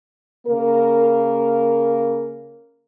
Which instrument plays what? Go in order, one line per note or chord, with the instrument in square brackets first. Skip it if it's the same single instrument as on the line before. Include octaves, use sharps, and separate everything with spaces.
[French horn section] C#3 A#3 A#4